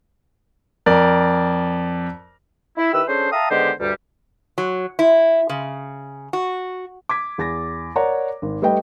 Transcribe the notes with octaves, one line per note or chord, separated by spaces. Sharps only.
F2 A#4 D5
E4
D#3 E4 G4 B4 E6
C#4 D4 G#4 A4 C5
E5 F5 G5 A5 A#5 D#6
D3 D#3 G#3 B3 G4 C5
D2 G2 G3
F#3
E4
C#3
F#4
D6 G#6 B6
E2 A6 A#6
A#4 C#5 D5 F#5 A#5
G#1
G3 A3 B4 D#5 G5